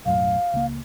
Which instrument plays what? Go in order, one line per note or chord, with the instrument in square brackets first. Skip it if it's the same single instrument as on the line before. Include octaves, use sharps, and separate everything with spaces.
[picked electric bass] B1 F#2 A2 [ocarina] F5
[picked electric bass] C#2 A#3